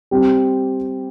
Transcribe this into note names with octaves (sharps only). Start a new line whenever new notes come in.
G3 C4 G4